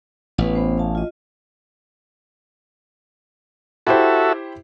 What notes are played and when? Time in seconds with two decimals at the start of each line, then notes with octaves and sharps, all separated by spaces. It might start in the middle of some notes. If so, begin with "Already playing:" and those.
0.38 A1 B3 C#4 B4
0.53 B3 C5 B5
0.78 F5 A5
0.95 F4 D#5
3.87 E4 F#4 G4 A4 C5 E5